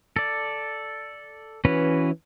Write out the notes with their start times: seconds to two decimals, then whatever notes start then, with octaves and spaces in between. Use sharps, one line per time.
0.16 A4 D5
1.65 E3 C#4 F#4 B4